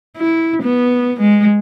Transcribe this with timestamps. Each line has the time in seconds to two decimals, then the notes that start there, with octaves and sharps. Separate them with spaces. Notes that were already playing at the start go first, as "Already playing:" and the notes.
0.17 E4
0.62 B3
1.20 G#3